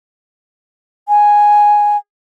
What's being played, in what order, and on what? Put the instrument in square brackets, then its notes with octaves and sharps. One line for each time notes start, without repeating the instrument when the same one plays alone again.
[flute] G#5